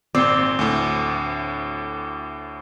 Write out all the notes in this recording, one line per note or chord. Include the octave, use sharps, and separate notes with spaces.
G#1 A#2 C4 D5 D6 C7 G7
D2 A2